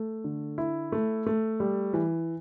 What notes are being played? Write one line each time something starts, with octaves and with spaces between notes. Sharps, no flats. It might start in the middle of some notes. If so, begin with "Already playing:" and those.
Already playing: A3
D3
E4
A3
A3
G3
E3